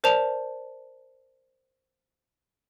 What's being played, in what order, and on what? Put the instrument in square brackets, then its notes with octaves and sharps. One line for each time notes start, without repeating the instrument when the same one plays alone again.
[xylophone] A#4 C5 D5 A5 F7